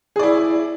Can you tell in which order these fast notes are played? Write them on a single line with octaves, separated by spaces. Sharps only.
G#4 D5 E4